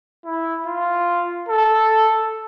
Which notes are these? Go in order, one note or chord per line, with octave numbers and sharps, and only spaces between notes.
E4
F4
A4